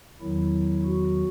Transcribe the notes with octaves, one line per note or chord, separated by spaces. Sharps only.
E2 D#3 F#3 E4
F#4